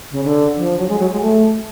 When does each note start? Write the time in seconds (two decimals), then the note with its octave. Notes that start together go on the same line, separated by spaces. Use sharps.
0.11 C#3
0.24 D3
0.57 F3
0.78 F#3
0.89 G#3
0.99 F#3
1.12 G#3
1.21 A3